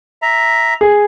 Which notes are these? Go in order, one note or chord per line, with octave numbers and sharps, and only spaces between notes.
E5 A#5
G#4